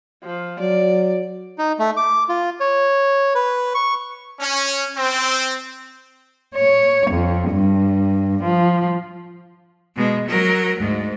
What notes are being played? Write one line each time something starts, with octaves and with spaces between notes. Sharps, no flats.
F3
F#3 D5
D#4
A3
D6
F4
C#5
B4
C#6
C#4
C4
C#5
F2
G2
F3
B2 G#3
F#3 A#4
D2 G#2